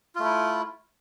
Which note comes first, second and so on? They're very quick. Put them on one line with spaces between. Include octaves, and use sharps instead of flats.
F4 A3 E4